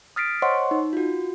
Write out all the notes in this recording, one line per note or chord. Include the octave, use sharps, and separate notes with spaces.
D#6 F6 A6 B6 C7 D7
C5 C#5 D#5 F#5 C6 C#6
D#4
F4 F#4